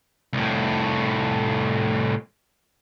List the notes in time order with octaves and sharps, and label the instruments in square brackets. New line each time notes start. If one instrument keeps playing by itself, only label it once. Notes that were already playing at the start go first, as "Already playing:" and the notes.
[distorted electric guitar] C2 A2